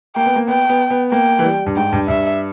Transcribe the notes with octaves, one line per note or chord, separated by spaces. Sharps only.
A#3 G5
B3
A#3
B3 G5
B3
B3
A#3 G5
E3
G3
G2
G#2 G5
G2
G2 E5